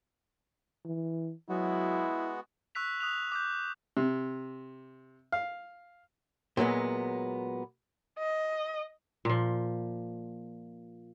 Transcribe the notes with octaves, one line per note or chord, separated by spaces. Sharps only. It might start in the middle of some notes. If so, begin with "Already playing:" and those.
E3
F#3 G#3 B3 E4 F#4
C#6 E6 F#6 B6 F7
D#6 F#6 F7
D6 F#6 G6
C3
F5
A#2 F#3 G#3 B3
D#5
A#2 F3